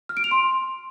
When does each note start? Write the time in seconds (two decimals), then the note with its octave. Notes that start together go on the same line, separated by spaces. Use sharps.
0.09 F6
0.17 D7
0.24 F7
0.31 C6